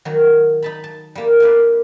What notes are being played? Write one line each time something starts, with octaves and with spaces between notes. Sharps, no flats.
D#3 F#3
D#4 A5 B5
A5
G3 A#3
A#3 D4 B4 D5